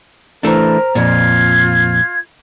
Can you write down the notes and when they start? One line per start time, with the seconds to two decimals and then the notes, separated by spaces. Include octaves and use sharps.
0.43 E3 A3 D4 A#4 C5 A#5
0.95 F2 A#2 F4 G#6